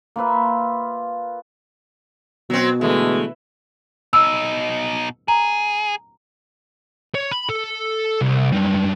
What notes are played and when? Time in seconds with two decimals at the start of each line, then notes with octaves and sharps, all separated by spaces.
0.16 A#3 F4 B4 E5
2.50 B2 F#3 C4
2.81 D3 E3 G#3 A3
4.13 B2 D#4 E6
5.28 G#4 A#5
7.15 C#5
7.31 B5
7.49 A4
8.21 C2
8.52 F#2 G3